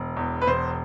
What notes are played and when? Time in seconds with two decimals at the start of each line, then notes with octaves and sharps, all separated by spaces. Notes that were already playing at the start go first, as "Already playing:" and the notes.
Already playing: E1
0.16 E2
0.42 B4
0.47 E1 C5